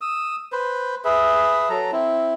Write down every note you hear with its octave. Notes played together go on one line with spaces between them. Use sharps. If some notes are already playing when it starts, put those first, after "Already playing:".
D#6 E6
B4 C5
G#4 B4 E5
F#3 A4 A#5
C4 E4